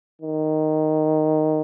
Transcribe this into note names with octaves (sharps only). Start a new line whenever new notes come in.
D#3